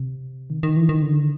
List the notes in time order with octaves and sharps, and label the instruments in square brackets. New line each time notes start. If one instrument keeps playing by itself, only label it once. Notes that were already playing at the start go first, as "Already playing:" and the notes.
Already playing: [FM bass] C3
D#3
D#3
E3
D#3
D3